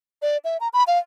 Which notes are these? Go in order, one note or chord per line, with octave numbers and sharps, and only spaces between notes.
D5
E5
A#5
B5
F5